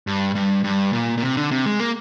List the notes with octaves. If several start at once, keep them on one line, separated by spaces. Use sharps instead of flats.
G2
G2
G2
A#2
A#2
C3
D3
C3
G#3
A#3